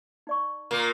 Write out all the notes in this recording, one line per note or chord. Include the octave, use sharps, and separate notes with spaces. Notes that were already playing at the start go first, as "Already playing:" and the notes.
D#4 D5 C#6
A#2 A#3